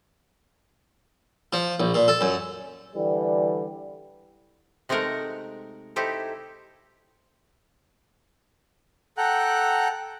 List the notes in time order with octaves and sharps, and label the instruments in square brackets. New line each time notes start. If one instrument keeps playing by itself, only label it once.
[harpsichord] F3
A#1
A#2
A4
F#2
[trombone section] D3 E3 G3
[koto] C3 G#3 A3 D#4 A#4 F#5
D#4 E4 G4 A4 C5
[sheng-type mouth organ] A4 F#5 G5 A#5 F#6